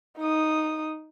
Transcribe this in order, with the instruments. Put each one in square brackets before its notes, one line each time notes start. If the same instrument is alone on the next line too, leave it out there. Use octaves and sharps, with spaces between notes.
[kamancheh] D#4 D#6